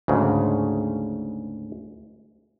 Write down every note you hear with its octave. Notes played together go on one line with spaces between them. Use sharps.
D2 G#2 C#3